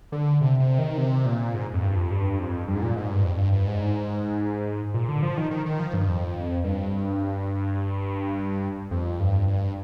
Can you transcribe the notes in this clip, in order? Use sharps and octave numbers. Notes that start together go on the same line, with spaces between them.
D3
C3
C3
D#3
C3
A#2
G#2
F2
G2
F2
G2
F2
G2
G#2
A#2
G#2
G2
F2
G2
G2
G#2
A#2
D3
F3
D#3
D#3
D#3
F3
G2
F2
G2
F2
G2
G2